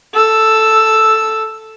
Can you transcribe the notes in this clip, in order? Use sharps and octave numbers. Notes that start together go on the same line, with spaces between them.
A4 E6